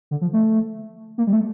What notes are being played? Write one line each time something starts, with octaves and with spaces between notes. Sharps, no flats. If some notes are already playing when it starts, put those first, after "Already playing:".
D3
F3
A3
A#3
G3
A3